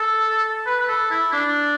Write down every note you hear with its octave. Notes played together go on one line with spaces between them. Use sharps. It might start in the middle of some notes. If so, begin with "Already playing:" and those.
Already playing: A4
B4
B4
A4
E4
D4